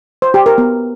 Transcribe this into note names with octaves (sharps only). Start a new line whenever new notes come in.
C5
G4
A#4
B3